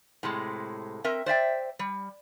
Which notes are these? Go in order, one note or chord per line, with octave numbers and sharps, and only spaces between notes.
A2 C3 G#3
C4 A#4 E5
C5 D5 E5 G5
G3